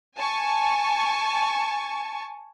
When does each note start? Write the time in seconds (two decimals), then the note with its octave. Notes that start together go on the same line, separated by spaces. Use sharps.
0.17 G#5 A5 C#6